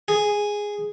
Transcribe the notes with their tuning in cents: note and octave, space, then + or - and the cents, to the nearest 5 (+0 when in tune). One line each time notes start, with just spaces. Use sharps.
G#4 -5